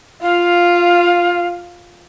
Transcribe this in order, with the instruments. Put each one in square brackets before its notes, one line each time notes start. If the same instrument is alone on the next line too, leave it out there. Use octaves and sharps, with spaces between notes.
[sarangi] F4 [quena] F5